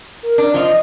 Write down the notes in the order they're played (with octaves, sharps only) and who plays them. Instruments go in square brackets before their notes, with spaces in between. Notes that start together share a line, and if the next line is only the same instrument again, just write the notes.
[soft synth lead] A#4
[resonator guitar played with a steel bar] D4
[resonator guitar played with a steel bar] F3 F4 [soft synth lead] D#5